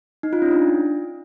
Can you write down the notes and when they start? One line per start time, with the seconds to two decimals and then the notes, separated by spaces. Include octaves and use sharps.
0.23 D#4
0.33 F4
0.42 C#4
0.51 D4